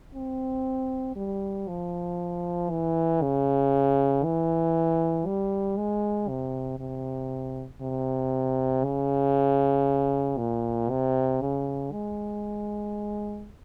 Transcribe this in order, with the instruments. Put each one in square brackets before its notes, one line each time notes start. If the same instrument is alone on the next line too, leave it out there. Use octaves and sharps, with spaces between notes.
[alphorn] C4
G3
F3
E3
C#3
E3
G3
G#3
C3
C3
C3
C#3
A#2
C3
C#3
G#3